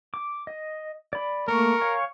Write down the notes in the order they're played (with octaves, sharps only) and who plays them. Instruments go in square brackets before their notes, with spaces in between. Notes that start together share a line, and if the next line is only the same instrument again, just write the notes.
[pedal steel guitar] D6
D#5
D5 B5
[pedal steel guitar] A3 A#3 [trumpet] A#4 [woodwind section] C#6
[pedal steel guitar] C#5 F5 G#5